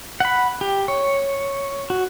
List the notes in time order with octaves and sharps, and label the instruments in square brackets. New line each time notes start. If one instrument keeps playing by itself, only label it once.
[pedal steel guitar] F#5 B5
G4
C#5
F#4